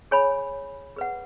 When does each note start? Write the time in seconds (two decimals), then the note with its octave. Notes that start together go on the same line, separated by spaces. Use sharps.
0.11 G#4 C#5 G#5 B5
0.96 G#4 B4 F#5